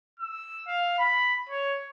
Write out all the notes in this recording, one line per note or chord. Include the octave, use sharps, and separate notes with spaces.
E6
F5
B5
C#5